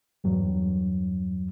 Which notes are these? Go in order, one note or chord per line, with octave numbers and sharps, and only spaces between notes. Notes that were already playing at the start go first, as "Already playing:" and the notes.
E2 G2 F#3